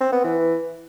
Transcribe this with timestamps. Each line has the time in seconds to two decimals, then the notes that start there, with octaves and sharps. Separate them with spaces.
0.01 C4
0.12 B3
0.24 E3